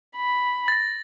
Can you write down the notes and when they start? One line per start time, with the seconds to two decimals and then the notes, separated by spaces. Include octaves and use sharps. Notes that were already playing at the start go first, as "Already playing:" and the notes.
0.16 B5
0.68 A6 A#6